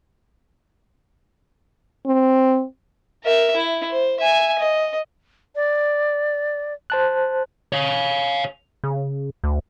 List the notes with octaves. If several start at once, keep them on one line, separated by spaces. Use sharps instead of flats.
C4
A#4 E5
E4
C5
E5 G#5
D#5
D5
C5 A5 F#6
C#5 F5
C#3
D2